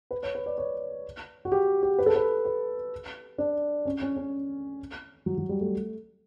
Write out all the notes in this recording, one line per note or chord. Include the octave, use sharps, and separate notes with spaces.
B4
C#5
B4
D5
C#5
F#4
G4
G4
B4
A4
B4
B4
D4
C#4
C#4
C#4
F#3
F#3
G3
A3